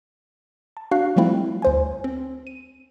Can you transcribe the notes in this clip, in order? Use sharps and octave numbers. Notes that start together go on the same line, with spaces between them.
A5
D4 F#4 F5 F#6 C7
F3 G3 A3 C4 E4 F4
D2 C5 G#5
C4
D#7